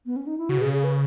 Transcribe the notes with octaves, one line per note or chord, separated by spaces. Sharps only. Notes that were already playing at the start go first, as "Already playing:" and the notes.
B3
C#4
D#4
E4
C#3 F#4
B2
G#4
C#3
G#4
B4